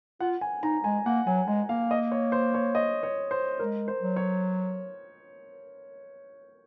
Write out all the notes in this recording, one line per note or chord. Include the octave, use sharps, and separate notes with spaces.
F4 F#5
G#5
D#4 A#5
G#3 G#5
A#3 F#5
F#3 G#5
G#3 G#5
A#3 F5
D#5
C#5
C5
C#5
D#5
C#5
C5
G#3 A#4
C5
F#3
C#5